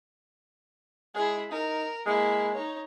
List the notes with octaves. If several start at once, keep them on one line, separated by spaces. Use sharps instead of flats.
G#3 E4 G#4
D#4 A#4
G#3 A#3 E4
D#4 C#5